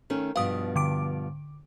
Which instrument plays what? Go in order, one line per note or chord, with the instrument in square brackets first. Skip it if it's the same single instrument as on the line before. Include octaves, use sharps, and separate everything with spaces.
[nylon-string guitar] D#3 A3 C#4
[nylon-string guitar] G2 B2 F3 [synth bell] F5 D#6
[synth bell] D3 D6 D7